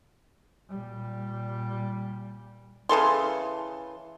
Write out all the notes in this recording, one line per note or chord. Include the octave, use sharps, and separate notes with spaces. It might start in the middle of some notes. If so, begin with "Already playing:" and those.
A#2 G3
C#3 E3 A4 C6